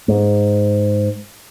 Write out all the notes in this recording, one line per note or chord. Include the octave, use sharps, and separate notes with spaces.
G#2